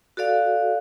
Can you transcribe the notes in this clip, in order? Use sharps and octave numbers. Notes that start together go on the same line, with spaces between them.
F#4 A4 D5 F5